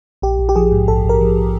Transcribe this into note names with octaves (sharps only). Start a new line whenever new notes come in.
A#1 G4
A#1
G4
F3 G#4
G#2
A#1 A4
A#1
A#4
F3